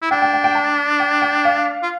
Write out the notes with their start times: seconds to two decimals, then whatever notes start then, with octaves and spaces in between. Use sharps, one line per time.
0.02 E4
0.11 D4 G5
0.22 G5
0.33 G5
0.44 G5
0.55 A5
1.00 G5
1.22 G5
1.45 F5
1.83 F4